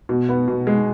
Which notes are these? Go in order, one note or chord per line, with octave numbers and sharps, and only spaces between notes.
B2
B3
B2
G#3